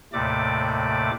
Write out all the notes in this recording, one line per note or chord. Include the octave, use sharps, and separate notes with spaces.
D#2 A2 C3 A3 D5 D6